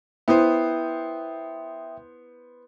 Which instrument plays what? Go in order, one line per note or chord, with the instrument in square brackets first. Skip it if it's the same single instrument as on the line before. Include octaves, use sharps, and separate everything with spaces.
[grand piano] B3 C5 [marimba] E4 [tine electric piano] E5 G5 D#6